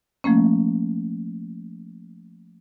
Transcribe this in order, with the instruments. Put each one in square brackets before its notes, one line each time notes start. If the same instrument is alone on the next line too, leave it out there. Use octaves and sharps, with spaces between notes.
[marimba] F3 A3 A#3 C#4